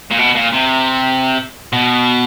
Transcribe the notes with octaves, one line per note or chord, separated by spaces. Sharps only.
A#2
B2
A#2
C3
B2